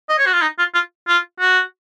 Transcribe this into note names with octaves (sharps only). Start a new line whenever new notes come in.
D#5
C#5
F#4
F4
D#4
F4
F4
F4
F#4